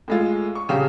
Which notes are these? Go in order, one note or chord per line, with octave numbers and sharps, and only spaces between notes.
A2 G#3 F4
C#6
D#1 C#3 G4 F5